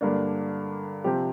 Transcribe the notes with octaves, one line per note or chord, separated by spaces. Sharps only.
G2 D3 A#3 D4
C3 F3 C4 G4